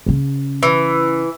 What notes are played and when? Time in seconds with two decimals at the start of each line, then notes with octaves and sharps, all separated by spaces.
0.06 C#3 C#4
0.63 E3